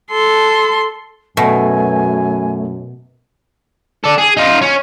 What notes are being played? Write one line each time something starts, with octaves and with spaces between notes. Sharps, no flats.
A4 C6
F#2 B2 A3 G#5
A4 D5
G#4
D#4 F4
C#4